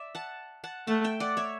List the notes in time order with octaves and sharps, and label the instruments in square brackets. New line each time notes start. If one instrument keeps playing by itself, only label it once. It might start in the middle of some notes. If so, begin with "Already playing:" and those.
Already playing: [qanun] D5 E5
F#5 A5
F#5 A5
[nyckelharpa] A3 [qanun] F#5 A5
[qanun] E5 G5
D5 F#5
C#5 E5